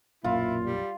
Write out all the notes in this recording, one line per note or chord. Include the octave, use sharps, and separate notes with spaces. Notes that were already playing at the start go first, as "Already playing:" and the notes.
D#1 B1 F#2 A#2 E4 F4
G3